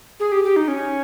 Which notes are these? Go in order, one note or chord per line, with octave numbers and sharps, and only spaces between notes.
G#4
G4
G4
D#4
C#4